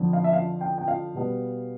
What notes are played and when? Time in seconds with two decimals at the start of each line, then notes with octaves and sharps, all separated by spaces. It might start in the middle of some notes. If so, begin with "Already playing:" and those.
Already playing: F2 D3 F3 C4
0.13 F5
0.24 E5
0.33 F5
0.61 G5
0.78 G5
0.88 F5
1.15 B2 G3 B3